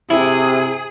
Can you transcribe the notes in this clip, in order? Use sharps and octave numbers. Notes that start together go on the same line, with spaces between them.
C3 E4 G#4